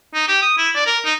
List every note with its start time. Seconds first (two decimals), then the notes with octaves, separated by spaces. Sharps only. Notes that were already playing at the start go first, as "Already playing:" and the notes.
0.14 D#4
0.28 G4
0.42 D#6
0.58 E4
0.75 D5
0.86 A#4
1.05 D#4